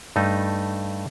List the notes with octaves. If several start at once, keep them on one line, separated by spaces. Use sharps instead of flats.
G2 A3 D#4